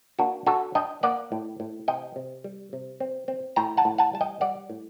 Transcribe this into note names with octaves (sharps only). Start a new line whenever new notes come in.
A#3 D4 F#4
D4 F#4 A4
D4 D#5 G5
A#3 D5 F#5
A2
A2
C3 D#5 G5
C3
G3
C3
C4
C4
A2 G5 A#5
F#5 A5
A2
F#5 A5
G3 A5
D#5 G5
G3 D5 F#5
A2